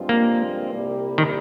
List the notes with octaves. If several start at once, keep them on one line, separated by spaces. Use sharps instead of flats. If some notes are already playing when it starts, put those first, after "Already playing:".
Already playing: G2 F3 G#3 C4 F4
A#3
C2 A#2 G3 A#3
D#3